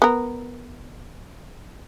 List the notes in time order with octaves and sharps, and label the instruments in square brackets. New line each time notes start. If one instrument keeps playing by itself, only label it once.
[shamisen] B3 A#4